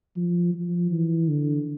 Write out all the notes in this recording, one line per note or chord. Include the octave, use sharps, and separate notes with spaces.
F3
F3
E3
D3